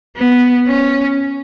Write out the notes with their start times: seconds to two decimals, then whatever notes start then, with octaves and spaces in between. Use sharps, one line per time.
0.17 B3
0.68 C#4